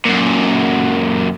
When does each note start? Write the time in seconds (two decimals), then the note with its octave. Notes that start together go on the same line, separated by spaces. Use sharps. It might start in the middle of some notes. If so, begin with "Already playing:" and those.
0.05 F#2 A#2